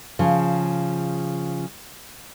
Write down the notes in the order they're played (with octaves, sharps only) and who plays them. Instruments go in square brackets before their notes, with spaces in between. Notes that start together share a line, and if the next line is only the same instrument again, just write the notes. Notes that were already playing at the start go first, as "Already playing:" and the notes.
[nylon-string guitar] C#3 F3